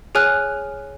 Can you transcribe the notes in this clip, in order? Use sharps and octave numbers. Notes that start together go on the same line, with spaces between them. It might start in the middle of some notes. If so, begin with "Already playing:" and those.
G#4 C#5 G#5 F6 F#6